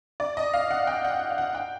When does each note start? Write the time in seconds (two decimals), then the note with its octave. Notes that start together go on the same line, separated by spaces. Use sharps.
0.20 D5
0.37 D#5
0.53 F5
0.71 F#5
0.87 G5
1.05 F#5
1.30 F5
1.38 F#5
1.55 G5